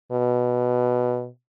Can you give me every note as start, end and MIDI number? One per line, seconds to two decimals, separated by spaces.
0.12 1.28 47